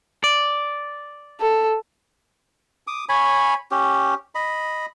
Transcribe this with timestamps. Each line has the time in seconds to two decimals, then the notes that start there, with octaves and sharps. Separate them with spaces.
0.24 D5
1.41 A4
2.87 D6 D#6
3.09 C#5 G#5 B5
3.71 C#4 G4
4.35 D#5 B5